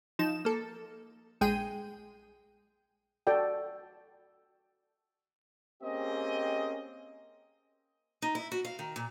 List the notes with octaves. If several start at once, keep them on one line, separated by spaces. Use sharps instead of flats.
F3 D#4 E7
A#3 A4
A#1 G#3 G#4 G5 D#7
F#4 A4 D5 G5
A#3 C4 C#4 G4 G#4 D#5
D#4
E4
F#4
F5
D#3
A#2